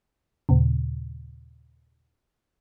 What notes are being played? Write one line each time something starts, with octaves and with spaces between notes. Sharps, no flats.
D#2 A#2 C#3